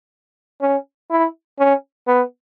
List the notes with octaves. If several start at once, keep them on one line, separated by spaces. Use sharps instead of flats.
C#4
E4
C#4
B3